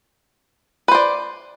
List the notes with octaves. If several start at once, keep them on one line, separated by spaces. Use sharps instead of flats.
B4 C5 D5